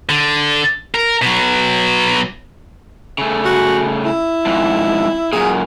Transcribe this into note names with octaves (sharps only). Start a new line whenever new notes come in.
D3
A#4
B2 F#3
C#3 A3
F#4
E4
F2 G#2
F#2 A#2 G#4